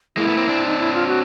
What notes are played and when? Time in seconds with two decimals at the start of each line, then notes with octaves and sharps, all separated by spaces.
0.17 G#3 A#3 E4
0.28 A3 B3
0.37 A#3 C4
0.48 C4 D4
0.66 D#4
0.79 E4
0.94 F4
1.07 F#4